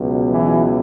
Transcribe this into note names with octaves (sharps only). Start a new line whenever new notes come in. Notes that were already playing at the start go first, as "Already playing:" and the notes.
Already playing: C#2 B2 F#3
E3 E4